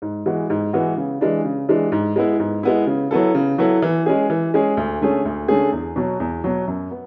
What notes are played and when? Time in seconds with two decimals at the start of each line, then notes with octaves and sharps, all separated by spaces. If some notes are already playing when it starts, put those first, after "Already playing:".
0.02 G#2
0.26 E3 G#3 B3 F#4
0.50 G#2
0.73 E3 G#3 B3 F#4
0.97 C#3
1.21 E3 G#3 D4
1.45 C#3
1.69 E3 G#3 D4
1.92 G#2
2.16 G#3 B3 E4
2.39 G#2
2.63 G#3 B3 E4
2.87 C#3
3.11 F#3 B3 E4 A4
3.35 C#3
3.58 F#3 B3 E4 A4
3.82 E3
4.06 G#3 C#4 G#4
4.30 E3
4.54 G#3 C#4 G#4
4.77 D2
5.01 D3 A3 C#4 G#4
5.25 D2
5.48 D3 A3 C#4 G#4
5.72 E2
5.96 B2 F#3
6.20 E2
6.44 B2 F#3
6.67 F#2
6.91 B3